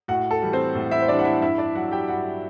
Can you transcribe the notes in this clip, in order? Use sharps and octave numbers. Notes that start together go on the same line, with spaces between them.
A2 F#4 F#5
A4
E3 G3
C4 C5
A2
E4 E5
C5
E3 G3 D4 D5
F#5
E4 E5
G2 E4 E5
D4 D5
F#3 F#4 F#5
G4 G5
G2 F#4 F#5